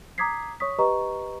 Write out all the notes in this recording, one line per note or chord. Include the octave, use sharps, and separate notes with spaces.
A#5 D6 D#6 G#6 B6 C7
C#5 C#6 D#6 B6
G4 B4 D#5 A#5 C#6